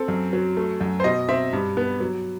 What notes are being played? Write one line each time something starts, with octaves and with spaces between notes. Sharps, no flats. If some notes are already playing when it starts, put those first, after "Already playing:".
Already playing: C4 A4
F#2
F#3
A3
F#2
C5
B2 D#5
C4 E5
G2
B3
F#3